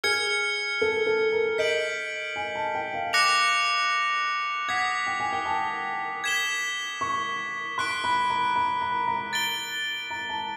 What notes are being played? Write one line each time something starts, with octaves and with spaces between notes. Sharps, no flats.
G#4 F6 G#6 C#7
A4
A4
A#4
D#5 G6 B6 D7 F#7
G#5
A5
G5
F5
D6 F#6 A#6 C#7 F7
F#5 D#6 G#6 B6
G5
G#5
G5
A5
G#6 B6 E7 G7
C#6
C6 F#6 B6 D7 G7
B5
A#5
B5
A#5
A#5
A6 D7 G7
A#5
A5